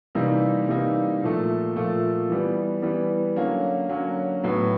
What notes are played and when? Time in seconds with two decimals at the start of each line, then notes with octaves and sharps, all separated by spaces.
0.15 C3 E3 G3 A#3 D#4
0.68 C3 E3 G3 A#3 D#4
1.22 A#2 F3 A3
1.76 A#2 F3 A3
2.30 E3 G3 B3
2.82 E3 G3 B3
3.36 D3 F#3 A#3 C#4
3.89 D3 F#3 A#3 C#4
4.43 A2 F#3 B3